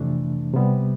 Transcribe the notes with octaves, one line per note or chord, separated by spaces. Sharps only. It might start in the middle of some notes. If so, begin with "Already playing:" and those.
Already playing: F2 C3 E3 A3 D4
C3 G3 B3